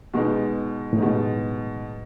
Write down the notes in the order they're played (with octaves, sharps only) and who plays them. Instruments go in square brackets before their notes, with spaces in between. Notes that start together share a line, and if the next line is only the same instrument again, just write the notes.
[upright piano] B2 G#3 D#4
[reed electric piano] A2
[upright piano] B2 G#3 D#4